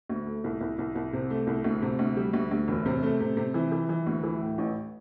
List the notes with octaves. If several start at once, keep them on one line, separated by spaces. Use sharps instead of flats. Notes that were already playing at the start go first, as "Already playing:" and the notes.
D2
A3
C2
C2
C2
C2
C3
A3
C2
D2
C3
D2
G3
D2
D2
E1
C3
A3
C3
C3
E3
E3
E3
D2
E3
A2
A1